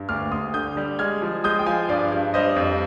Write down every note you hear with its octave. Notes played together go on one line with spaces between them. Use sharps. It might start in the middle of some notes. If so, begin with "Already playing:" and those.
Already playing: G2
D2 D6 F6
D2 C6 D#6
D3 D#6 G6
G3
G#3 F6 G#6
F3
G#3 D#6 G6
G5
F3 F5 G#5
G2 D5 F5
G2
G3 C5 D#5
F2